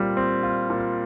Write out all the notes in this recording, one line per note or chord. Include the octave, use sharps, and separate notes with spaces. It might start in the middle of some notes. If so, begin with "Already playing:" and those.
Already playing: A#2 G3 C4 F4
C4
F4
A#2